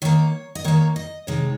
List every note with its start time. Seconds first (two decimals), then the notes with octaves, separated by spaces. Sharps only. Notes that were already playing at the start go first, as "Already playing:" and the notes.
0.02 D#3 A#3 C#5
0.55 D#5
0.64 D#3 A#3 C#5
0.96 D#5
1.27 C3 D#3 G#3 C#5